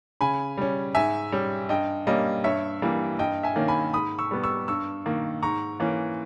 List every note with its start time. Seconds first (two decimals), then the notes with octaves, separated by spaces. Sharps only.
0.21 C#3 G#5 B5
0.57 G3 C#4
0.95 G#2 E5 G#5
1.32 G3 C#4
1.69 G2 D#5 G5
2.07 G3 A#3 C#4 D#5
2.44 G2 C#5 E5
2.82 E3 G3 A#3
3.19 G2 D#5 G5
3.43 E5 G#5
3.56 D#3 A#3 C#4
3.68 G#5 B5
3.93 G#2 B5 D#6
4.19 C#6 E6
4.31 G3 B3
4.43 C#6 E6
4.68 G2 C#6 E6
5.06 D#3 A#3
5.42 G#2 A#5 C#6
5.80 E3 A#3 C#4